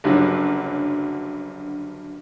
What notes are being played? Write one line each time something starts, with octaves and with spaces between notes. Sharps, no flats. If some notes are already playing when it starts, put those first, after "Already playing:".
F#1 G2 D3 F#3